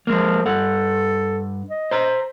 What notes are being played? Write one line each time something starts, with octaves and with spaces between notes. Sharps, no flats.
F3 G#3 A#3
G2 A4 F#5
D#5
C5 A#5